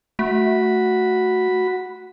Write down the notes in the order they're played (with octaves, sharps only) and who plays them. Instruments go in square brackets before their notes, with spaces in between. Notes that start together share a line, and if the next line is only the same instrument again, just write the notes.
[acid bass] A3 [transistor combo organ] F#4 B5